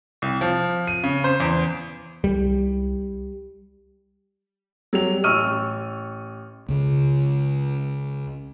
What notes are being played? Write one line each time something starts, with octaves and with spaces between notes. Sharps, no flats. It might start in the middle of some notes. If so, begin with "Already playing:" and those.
C2
F3
D#7
C#3
C5
E2
C2 G3
F#3 G3 F7
A1 C#6 E6 F6 D#7
C#2 C#3